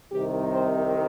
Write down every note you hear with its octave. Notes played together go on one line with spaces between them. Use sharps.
C2 C3 D#3 G4
C5